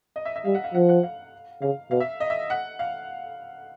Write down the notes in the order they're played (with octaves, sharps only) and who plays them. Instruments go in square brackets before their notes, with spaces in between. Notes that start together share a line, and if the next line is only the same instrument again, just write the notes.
[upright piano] D#5
E5
E5
[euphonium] G3 [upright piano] F5
[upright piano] F#5
F5
[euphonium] F3 [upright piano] F#5
[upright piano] F#5
F5
[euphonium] C#3 [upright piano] F5
[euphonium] B2 [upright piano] F5
[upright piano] E5
D#5
E5
F#5
F5